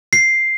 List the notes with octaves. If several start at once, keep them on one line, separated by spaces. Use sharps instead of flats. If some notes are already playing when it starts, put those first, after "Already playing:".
C7